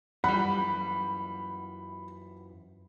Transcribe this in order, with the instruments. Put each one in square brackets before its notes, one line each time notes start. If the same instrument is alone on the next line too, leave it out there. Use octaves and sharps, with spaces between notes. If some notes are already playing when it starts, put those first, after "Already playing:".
[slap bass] F#2 E3 [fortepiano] G3 F#5 [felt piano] B5